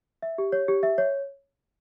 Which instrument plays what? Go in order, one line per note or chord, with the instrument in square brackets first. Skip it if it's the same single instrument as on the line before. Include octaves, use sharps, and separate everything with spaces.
[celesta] E5
G4
C#5
G4
E5
C#5